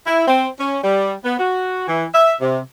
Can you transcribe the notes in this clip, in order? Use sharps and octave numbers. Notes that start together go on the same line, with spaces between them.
E4
C4
C#4
G3
B3
F#4
E3
E5
C3